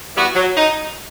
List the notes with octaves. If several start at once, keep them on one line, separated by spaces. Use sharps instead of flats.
E3 G3 B3 F#4
F#3
D#4